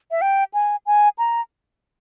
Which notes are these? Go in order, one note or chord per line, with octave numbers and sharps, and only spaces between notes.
E5
G5
G#5
G#5
A#5